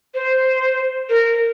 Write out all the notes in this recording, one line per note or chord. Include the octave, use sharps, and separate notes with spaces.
C5
A#4